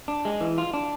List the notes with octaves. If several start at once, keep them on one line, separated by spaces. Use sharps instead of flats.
D4
G#3
E3
F4
D4